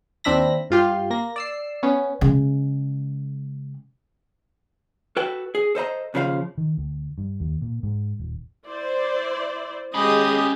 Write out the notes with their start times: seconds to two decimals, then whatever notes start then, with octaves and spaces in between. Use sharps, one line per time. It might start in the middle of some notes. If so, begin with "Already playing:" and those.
0.24 D#2 C4 D4 E5 B5 A#6
0.70 G2 F4 G4 C6
1.10 A#3 A#6
1.36 D5 E6 C7
1.83 B3 C#4
2.21 C#3 G#3
5.17 F#4 A4 B4 G5
5.55 G#4
5.75 A4 C5 D#5 A#5
6.14 D#2 C#3 F3 B4 F5
6.58 D#3
6.78 D2
7.18 G2
7.40 D#2
7.62 A#2
7.83 G#2
8.19 D#1
8.67 E4 C5 D5
9.94 G#3 C#4 G4 G#4 D#5 B5 D#6